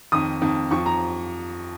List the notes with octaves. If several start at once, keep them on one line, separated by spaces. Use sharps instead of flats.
F2 D#3 D#6
F2 D#3
F2 F3 C#6
A#5